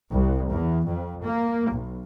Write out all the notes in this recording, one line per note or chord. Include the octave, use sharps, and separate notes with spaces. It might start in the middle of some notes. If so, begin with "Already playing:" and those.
C2
E2
F2
A#3
B1